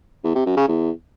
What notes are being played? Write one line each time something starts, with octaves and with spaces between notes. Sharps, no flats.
E2
C3
F#2
C#3
E2